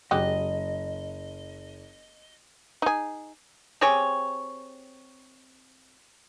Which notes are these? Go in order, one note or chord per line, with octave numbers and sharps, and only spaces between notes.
F#1 G#3 F#4 G4 D#5
D#4 G#4
C4 G4 G#4 C#5